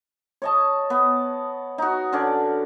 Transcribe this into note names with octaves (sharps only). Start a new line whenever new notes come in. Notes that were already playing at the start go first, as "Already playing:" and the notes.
C#5 D#5 A5
B3
D#4 F#4
D3 C#4 D5